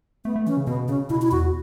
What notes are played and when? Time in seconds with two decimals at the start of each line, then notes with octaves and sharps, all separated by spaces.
0.24 A3 B3
0.36 A3
0.47 E3 C#4
0.57 C#3
0.67 B2 B3
0.88 C#3 C#4
1.09 B2 E4
1.22 E4
1.32 E2 F#4